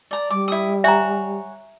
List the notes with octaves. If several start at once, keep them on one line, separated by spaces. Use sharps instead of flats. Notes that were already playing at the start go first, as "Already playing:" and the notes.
D5 A#5
G3 D6
E4 D#6
C#5 E5 F#5 G#5 A#5